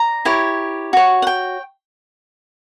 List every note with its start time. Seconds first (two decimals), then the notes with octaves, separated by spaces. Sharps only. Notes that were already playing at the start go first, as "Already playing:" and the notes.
Already playing: D5 A#5
0.25 E4 G4 C#5
0.93 F#4 C#5
1.22 F#5
1.27 G5